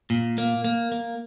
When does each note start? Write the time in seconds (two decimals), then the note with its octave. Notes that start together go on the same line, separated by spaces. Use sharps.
0.10 A#2
0.38 A#3
0.65 A#3
0.92 A#3